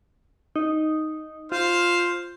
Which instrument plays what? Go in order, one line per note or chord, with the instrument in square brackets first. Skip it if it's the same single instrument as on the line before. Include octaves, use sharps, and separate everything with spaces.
[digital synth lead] D#4
[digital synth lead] F4 [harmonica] C5 F5